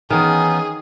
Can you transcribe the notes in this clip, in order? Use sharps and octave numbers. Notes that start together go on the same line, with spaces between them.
D#3 E3 B3 C#4 D#4 G#4 A#5